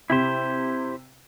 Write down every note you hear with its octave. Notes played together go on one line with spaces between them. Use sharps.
C3 E4 G4 C5